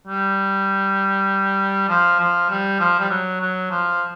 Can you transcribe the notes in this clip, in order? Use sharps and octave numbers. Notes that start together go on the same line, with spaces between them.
G3
F3
F3
G3
F3
G3
F#3
F#3
F3